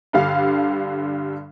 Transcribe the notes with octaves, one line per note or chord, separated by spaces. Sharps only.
G2 D3 G3 F5